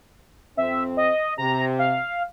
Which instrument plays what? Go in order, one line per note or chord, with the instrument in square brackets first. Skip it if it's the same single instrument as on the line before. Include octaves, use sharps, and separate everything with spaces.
[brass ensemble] F2 C4 [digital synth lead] E5
[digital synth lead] D#5
[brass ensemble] C3 [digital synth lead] A#5
[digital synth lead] F5